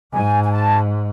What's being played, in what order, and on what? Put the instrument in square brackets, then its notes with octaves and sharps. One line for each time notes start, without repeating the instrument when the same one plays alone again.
[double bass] G#2 [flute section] G#5
[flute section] G#5
A5